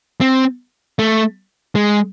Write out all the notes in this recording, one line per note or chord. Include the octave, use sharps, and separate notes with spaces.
C4
A3
G#3